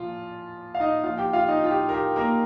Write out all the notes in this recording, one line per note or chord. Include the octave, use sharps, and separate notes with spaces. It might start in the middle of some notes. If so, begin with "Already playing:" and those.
Already playing: A#2 F3 F4
F5
D#4 D#5
A#2 F3 F4 F5
G4 G5
F4 F5
D#4 D#5
F4
G4
A#4
G4
A#3 A#4